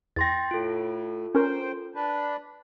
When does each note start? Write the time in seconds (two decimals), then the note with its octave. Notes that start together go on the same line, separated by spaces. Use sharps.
0.16 E2 G5 C6 A6 A#6
0.51 A2 F4 A4
1.35 C#4 A#4 C5 G5
1.95 D4 B4